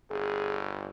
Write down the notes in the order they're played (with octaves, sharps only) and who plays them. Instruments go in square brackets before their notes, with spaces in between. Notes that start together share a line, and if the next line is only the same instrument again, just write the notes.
[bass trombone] G1 [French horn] G#4